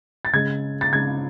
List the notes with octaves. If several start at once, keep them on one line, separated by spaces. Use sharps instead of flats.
A6
C#3 G#3 G#6
A6
C#3 G#3 G#6